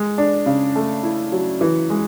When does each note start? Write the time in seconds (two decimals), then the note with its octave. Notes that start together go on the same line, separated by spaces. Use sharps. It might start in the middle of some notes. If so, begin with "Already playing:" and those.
Already playing: G#3
0.18 D4
0.46 C#3
0.76 A3
1.03 E4
1.32 F#3
1.61 E3
1.90 G#3